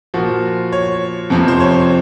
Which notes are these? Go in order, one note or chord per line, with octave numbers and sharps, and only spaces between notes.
A#2 F3 F#4
C#5
F2 C3 F3
C5
C#5